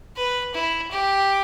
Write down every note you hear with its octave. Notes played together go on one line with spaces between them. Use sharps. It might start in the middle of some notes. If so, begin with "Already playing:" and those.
B4
E4
G4